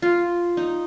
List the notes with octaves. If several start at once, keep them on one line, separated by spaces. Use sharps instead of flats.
F4
D#4